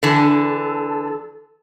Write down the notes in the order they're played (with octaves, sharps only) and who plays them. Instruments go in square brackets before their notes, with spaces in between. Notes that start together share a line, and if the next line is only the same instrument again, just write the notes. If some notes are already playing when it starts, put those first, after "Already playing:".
[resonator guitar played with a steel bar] D3 E3 [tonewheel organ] A4